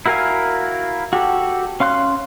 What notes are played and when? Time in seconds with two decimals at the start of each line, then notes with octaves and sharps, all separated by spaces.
0.06 E4 F#4 A#4 F5 G#5
1.13 F#4 G4 A4
1.80 C#4 F5 C6 F#6